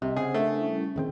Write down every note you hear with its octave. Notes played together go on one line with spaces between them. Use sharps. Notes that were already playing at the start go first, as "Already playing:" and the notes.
C2 C3 D#5
C#3 C4 G#4 C5 F#5
A3 D4 A#4 E5
G3 C#4 E4
D#1 D#3 C4 G#4 G5